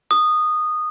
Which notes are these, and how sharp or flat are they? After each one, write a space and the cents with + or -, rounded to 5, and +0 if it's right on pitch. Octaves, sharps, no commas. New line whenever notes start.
D#6 -15